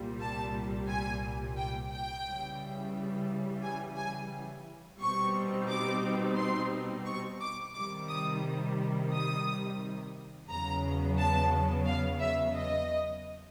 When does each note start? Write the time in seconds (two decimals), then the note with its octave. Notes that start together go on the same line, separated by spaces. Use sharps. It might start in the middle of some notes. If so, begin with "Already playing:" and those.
Already playing: C2 A#2 G3
0.20 A5
0.88 G#5
1.58 G5
1.92 G5
2.27 C#3 E3 G3
3.63 G#5
3.98 G#5
5.01 B2 G3 C4 D#4 C#6
5.69 D6
6.37 C6
7.06 C#6
7.41 D6
7.75 C3 D#3 G3 D6
8.09 D#6
9.13 D#6
10.49 E2 C#3 F#3 B3 A#5
11.18 A5
11.86 F5
12.21 E5
12.55 D#5